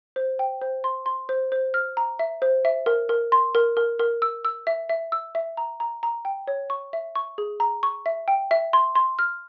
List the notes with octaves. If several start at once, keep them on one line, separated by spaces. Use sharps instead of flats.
C5
G5
C5
C6
C6
C5
C5
F6
A#5
E5
C5
E5
A#4
A#4
C6
A#4
A#4
A#4
E6
E6
E5
E5
E6
E5
A#5
A#5
A#5
G5
C#5
C#6
E5
C#6
G#4
A#5
C#6
E5
G5
E5
C6
C6
F6